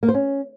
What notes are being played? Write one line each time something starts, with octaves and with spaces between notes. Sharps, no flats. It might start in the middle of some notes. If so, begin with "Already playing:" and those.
A#3
C5
C#4